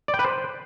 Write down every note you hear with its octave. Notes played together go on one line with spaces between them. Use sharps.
D5
G5
B4
C5